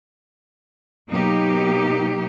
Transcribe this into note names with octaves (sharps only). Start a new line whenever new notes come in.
B2 F#3 A#3 D#4 G4